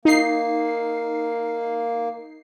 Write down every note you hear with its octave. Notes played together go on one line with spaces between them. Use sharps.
A#3 D#4 C7